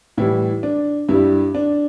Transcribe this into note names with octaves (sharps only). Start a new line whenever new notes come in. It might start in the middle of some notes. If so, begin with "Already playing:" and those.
A2 E3 G3 E4
D4
G2 G3 E4
D4